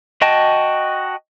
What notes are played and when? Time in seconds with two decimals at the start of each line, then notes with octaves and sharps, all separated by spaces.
0.22 F#4 D#5 G5 A5